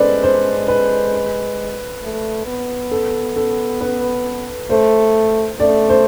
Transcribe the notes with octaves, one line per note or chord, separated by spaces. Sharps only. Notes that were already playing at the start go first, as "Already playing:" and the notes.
Already playing: G#3 A4 B4 C5 D5
C5
B4
A3
B3
A4
A4
B4
A3 C5
A3 D5
C5